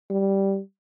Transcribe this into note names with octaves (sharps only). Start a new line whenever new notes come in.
G3